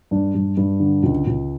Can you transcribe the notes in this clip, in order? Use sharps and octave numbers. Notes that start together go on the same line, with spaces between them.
G2 D4
G2
G2
D3
C#2
C#2